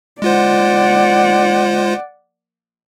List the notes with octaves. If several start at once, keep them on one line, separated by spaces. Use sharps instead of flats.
G#3 F4 C5 D5 F#5